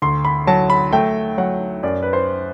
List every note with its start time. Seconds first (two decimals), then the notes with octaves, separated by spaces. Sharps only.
0.02 D2 C6
0.25 B5
0.47 F#3 A5
0.70 B5
0.92 A3 G5
1.38 F#3 F#5
1.83 F#2 D5
2.02 B4
2.13 C5